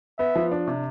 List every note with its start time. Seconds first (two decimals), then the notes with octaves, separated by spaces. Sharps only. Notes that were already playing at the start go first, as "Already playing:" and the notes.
0.18 B3 E5
0.35 F3
0.52 D4
0.68 C3